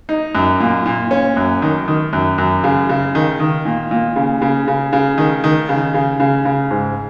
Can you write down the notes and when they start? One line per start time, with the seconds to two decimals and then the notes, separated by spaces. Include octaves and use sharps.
0.09 D#4
0.35 F#2
0.60 A#2
0.86 A#2
1.11 C#4
1.37 F#2
1.62 D#3
1.88 D#3
2.13 F#2
2.38 F#2
2.64 C#3
2.89 C#3
3.15 D#3
3.40 D#3
3.65 A#2
3.91 A#2
4.16 C#3
4.42 C#3
4.68 C#3
4.93 C#3
5.18 D#3
5.44 D#3
5.69 C#3
5.94 C#3
6.20 C#3
6.45 C#3
6.71 G#2